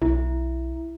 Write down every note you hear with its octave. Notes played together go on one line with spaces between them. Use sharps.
B1 E4